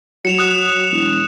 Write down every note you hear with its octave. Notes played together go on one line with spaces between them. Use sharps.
F#3 C#7 E7 F7
D#6 F#6 E7
E1